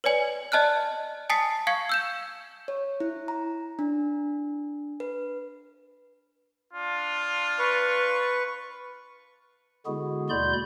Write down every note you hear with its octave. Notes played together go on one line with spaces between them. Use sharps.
B4 C#5 D5 G#5 F#7
D5 D#5 A5 F6 F#6
G#5 A5 D#6 A6 B6 C7
F5 C#6 G#6 C7 C#7
E6 G6 E7
C#5
E4
A#5
D4
B4
D4 F4
B4 C#6
D3 G#3 B3 E4 F#4 G#4
D#2 B2 D5 B5 C6 G6